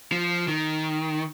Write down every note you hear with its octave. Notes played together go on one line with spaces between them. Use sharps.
F3
D#3